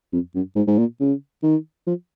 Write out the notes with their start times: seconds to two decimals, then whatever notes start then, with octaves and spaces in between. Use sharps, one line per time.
0.13 F2
0.35 F#2
0.56 G#2
0.67 G#2
0.78 A#2
1.00 C#3
1.43 D#3
1.87 F3